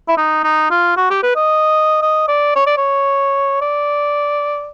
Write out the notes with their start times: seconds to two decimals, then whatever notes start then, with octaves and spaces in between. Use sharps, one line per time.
0.08 E4
0.17 D#4
0.43 D#4
0.71 F4
0.97 F#4
1.10 G4
1.23 B4
1.36 D#5
2.02 D#5
2.28 D5
2.56 C#5
2.67 D5
2.77 C#5
3.61 D5